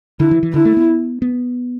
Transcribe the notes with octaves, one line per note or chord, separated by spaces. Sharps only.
D3 E4
E3
E3
D3 E4
A3
B3
B3